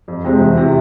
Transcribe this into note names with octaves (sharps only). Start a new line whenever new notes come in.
F2
C3 F3 G#3 C4
E2
C3 E3